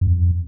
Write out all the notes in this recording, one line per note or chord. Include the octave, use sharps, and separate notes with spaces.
F#2
F2